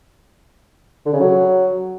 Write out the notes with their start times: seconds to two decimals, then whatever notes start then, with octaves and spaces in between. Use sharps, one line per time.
1.06 D3
1.13 C#3
1.20 F#3